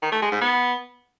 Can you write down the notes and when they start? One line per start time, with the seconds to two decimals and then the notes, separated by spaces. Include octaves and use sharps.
0.02 D#3
0.12 A3
0.22 G#3
0.32 G#2
0.41 B3